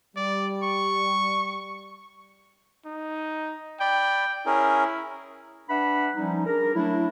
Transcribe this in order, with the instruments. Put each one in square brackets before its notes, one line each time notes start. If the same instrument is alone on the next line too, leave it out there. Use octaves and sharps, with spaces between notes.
[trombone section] G3 [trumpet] D5
[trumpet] C#6
D#4
[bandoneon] D5 B5 [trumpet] G5
[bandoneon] C#4 G#4 A#4 [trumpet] E4
[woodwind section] D4 B4 E5 F#5 B5
F3 G3 C#4 D#4
D4 G#4 A#4
F#3 A3 D4 E4